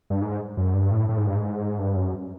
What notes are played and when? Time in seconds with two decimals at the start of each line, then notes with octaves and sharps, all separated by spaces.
0.10 G2
0.22 G#2
0.57 F#2
0.74 G2
0.91 A2
1.09 A2
1.18 G#2
1.27 G2
1.36 G#2
1.79 G2
1.96 F#2